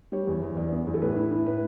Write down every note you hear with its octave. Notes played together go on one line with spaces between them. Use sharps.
G3 C#5
E2
E2
E2 D5
B3
E2
A4
A2 B4
E4
E4
A2 B4